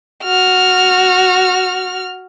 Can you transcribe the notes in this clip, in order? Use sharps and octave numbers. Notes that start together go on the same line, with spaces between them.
F#4 F6